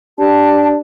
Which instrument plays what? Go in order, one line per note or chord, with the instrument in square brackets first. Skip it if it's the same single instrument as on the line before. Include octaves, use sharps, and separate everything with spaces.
[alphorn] D4 [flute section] G4 A5